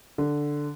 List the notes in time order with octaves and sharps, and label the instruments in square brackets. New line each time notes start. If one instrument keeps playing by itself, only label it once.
[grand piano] D3